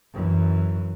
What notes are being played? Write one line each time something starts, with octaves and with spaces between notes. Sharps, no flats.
F#2 E3